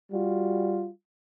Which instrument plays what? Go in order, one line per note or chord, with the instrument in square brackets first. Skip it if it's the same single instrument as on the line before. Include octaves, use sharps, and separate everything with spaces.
[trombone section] G3 F4 F#4